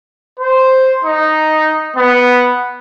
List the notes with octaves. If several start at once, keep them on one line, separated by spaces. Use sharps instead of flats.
C5
D#4
B3